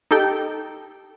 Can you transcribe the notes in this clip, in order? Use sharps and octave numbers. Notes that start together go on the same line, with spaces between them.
D#4 G4 A4 G5